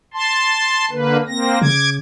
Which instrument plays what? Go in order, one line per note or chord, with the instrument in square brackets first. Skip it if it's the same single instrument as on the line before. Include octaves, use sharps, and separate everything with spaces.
[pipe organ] A5 C6
D3 A#3 B4
A#3 C4 A#6
[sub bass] C#3 [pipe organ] D6 G#6